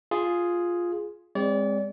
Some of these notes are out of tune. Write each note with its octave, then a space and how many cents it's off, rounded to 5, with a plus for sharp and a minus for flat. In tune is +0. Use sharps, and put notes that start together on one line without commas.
F4 +0 G#4 +0
G#3 -35 C4 +0 D5 -35